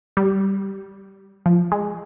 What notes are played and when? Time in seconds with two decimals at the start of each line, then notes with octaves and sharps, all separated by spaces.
0.17 G3
1.46 F3
1.72 G#3